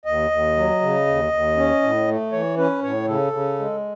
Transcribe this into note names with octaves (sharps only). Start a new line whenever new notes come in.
D#2 D#5
D#2
F#3
C#3
D#2
D#2
C#4
A2
A3
E3 C#5
C#4 B4
A2 C#5
C#3 A4
C#3
G#3